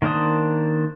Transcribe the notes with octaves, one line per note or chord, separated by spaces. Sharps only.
D#3 A#3 D4 C5 D#6